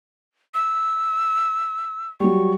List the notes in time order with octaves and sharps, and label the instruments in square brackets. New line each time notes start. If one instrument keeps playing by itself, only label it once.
[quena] E6
[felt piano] F#3 G3 [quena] C#6